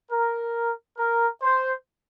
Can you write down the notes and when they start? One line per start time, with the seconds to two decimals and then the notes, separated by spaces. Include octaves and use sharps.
0.12 A#4
0.98 A#4
1.42 C5